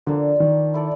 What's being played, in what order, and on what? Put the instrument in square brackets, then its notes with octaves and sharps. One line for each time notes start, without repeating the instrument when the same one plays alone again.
[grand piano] D3 [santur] F3 A#3 D4
[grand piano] D#3
[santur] E4 A4 D5